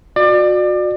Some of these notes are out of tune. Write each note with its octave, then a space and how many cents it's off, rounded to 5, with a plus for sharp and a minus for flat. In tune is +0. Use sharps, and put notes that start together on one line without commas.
F#4 -30 D5 +30